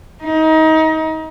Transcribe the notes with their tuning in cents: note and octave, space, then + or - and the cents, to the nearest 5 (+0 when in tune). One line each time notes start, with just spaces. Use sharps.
D#4 +30